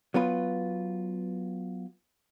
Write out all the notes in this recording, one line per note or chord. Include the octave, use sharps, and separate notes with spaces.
F#3 B3 F4 B4